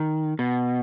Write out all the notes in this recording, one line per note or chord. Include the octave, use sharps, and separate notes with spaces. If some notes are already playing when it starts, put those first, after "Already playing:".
Already playing: D#3
B2